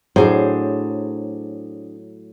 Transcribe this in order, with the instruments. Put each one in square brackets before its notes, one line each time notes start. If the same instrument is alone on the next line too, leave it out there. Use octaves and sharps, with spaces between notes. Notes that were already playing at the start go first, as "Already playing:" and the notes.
[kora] A2 F#3 [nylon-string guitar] D4 G#4 C5